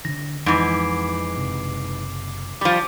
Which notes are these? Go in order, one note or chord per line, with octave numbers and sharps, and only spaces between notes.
D3 D#3 A#6
F2 G#2 E3 D6 C7 D7
F#1 C3
F3 G3 D6